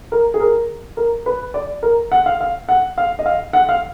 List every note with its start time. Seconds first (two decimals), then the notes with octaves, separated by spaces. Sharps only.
0.12 A#4
0.34 G#4
0.40 A#4
0.97 A#4
1.26 B4
1.54 D5
1.83 A#4
2.12 F#5
2.26 F5
2.41 F5
2.69 F#5
2.98 F5
3.19 D#5
3.26 F5
3.53 F#5
3.69 F5